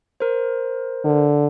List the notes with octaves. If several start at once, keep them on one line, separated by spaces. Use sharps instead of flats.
A#4 C5
D3